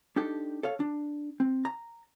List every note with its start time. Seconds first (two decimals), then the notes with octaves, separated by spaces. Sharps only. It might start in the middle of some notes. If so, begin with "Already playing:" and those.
0.16 D4 D#4 G4 A4
0.63 A4 C#5 F5
0.80 D4
1.40 C4
1.65 A#5